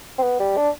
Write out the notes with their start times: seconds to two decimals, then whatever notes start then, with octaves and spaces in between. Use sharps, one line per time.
0.18 C4
0.23 B3
0.40 G3
0.57 D4